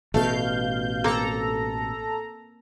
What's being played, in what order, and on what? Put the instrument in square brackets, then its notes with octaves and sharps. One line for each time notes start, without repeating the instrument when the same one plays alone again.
[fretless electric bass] A1 B2 [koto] A3 [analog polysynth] F5 G6
[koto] A#3 C4 [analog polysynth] A4 A#5